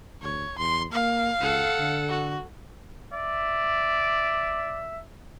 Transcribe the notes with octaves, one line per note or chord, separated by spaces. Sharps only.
D2 C#5
E2 C6
A#3 F5
C#2 A4 F#5
D3
F#4
D5 E5